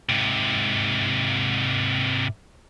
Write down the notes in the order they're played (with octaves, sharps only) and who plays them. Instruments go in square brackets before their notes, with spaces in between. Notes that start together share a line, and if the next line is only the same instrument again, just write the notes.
[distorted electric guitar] G#2 C3